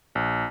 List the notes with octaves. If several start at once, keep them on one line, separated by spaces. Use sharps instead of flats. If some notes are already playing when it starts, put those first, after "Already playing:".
A#1